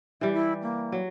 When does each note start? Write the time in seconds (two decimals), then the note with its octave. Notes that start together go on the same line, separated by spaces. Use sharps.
0.21 E3 G3 E5
0.33 E4
0.62 A#3
0.92 F#3